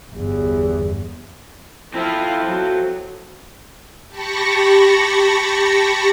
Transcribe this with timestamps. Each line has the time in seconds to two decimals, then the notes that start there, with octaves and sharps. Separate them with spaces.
0.12 G1 E2
1.94 C4 E4 F4 A4
2.45 F#3
4.08 G4 A5 B5 C#6 A#6 C#7